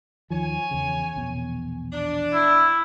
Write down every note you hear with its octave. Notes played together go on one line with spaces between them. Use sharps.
D#2 D#3 F3 C#5 G#5
E2 C#3
A#1 E2 B2
D4
E4